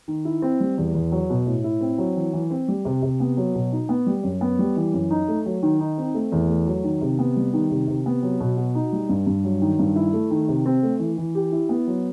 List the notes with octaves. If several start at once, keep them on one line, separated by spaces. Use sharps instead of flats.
D#3
E4
C4
G3
E2
E2
F#3
B2
A2
E4
C4
F#3
E3
E3
C4
G3
C3
C3
B3
F#3
B2
D#4
B3
G3
F#2
B3
G3
E3
F#2
D#4
A3
F#3
D#3
D#4
C4
A3
E2
A3
F#3
D#3
C3
B3
G3
D#3
C3
C3
B3
F#3
B2
F#4
D#4
G3
G2
G2
F#3
D#3
G2
E4
A3
D#3
C3
C4
A3
E3
E3
G4
E4
B3
F#3